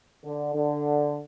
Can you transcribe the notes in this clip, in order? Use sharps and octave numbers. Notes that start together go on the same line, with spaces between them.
D3
D3